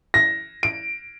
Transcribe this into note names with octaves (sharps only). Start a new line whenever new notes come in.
A#6
D7